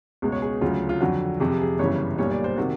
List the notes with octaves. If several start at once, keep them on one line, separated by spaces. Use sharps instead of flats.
C#2 B2 G#3
C#5
G#4
D2 C#3 F#3 F4
F4
F2 D3 F#3 F#4
F2 C3 F3 G#4
G4
G#4
G1 F#2 C#3 E3 G3 C#5
B1 A#2 G3 C#5
D5
C5
C3 D#3 F#4